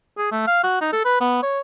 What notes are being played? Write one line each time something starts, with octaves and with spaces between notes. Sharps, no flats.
G#4
A3
F5
F#4
D#4
A4
B4
B3
C#5